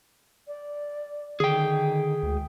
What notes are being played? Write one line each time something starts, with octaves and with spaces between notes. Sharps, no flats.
D5
D3 D#3 G#4 G5
D2 G#3